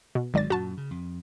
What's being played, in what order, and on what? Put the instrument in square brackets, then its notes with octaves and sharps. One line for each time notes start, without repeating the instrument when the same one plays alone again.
[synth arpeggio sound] B2
[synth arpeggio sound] G#1 D5 A6 [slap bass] D2 F#3 G#3
[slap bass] F#2 A#2 [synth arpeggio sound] F#4 A5
[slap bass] C#3
F2